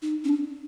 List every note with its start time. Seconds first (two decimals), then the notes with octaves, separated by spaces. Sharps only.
0.02 D#4
0.25 C#4
0.29 D4